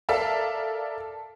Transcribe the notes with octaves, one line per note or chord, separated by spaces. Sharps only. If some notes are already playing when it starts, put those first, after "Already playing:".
A4 A#4 D5 E5 F5 A5